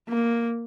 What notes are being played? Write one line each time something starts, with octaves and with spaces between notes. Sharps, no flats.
A#3